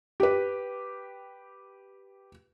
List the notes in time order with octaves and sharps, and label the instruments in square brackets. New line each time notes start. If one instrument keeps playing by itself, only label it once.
[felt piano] G4 B4